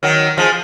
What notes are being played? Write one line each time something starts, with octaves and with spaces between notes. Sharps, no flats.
D#3 F#3
F3 G#3